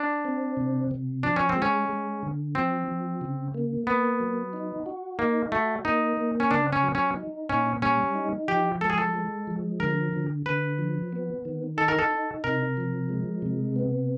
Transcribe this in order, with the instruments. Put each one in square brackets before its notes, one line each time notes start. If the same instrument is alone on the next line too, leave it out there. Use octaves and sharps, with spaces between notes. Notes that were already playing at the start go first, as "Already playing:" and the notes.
Already playing: [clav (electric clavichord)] D4
[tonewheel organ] C4
C3
C3
[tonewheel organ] F3 [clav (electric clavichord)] D4
[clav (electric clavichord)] C#4
C4
[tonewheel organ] G#3
[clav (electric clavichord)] C#4
[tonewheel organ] G#3
D3
[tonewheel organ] F3 [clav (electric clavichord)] C4
[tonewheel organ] F3
C#3
A#3
[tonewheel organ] A#3 [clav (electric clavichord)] B3
[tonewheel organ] F#3
D#4
F#4
[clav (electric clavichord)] A#3 [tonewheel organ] D#4
[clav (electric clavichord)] A3 [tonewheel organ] F#4
[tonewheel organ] A#3 [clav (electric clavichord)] D#4
[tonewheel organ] A#3
[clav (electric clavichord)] C#4
[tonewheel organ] C#3 [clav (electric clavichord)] D4
[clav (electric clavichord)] C#4
[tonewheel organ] F#3
[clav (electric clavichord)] C#4
[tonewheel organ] D#4
[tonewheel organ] A#2 [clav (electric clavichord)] C#4
[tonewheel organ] G3 [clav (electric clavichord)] C#4
[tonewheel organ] D#4
[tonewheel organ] F3 [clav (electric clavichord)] G4
[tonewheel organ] G#3 [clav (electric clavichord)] A4
[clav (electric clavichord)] G#4
A4
[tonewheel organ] G#3
F3
[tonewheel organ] D3 [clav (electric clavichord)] A#4
[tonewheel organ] D3
[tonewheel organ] D3 [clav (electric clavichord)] B4
[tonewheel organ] F3
B3
D#3
[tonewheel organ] D#4 [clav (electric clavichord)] A4
[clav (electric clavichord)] A#4
A4
[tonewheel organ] D#4
[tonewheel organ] C3 [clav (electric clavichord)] A#4
[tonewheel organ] F3
G#3
C3
B3